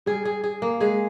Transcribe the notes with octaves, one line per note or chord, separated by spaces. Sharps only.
G3 G#4
G#4
G#4
A#3
G#3 G#4